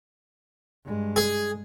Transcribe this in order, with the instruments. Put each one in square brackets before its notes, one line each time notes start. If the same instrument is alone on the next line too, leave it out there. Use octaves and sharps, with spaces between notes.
[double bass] G2 G#3
[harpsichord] G#4